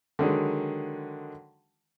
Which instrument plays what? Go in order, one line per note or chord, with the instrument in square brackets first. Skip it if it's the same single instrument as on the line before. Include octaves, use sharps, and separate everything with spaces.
[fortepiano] D3 D#3 F#3 G#3